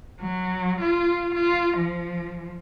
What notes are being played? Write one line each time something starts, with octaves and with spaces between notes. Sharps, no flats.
F#3
F4
F4
F3